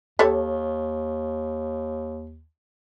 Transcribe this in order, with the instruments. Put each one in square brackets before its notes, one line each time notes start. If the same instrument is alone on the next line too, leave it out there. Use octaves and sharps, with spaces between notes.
[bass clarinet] D#2 [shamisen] G4 A4 C#5